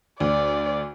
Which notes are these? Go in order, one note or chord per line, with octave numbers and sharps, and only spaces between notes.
D2 D5